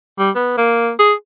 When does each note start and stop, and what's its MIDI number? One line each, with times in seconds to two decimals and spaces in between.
0.19 0.30 55
0.35 0.54 59
0.57 0.92 58
0.99 1.13 68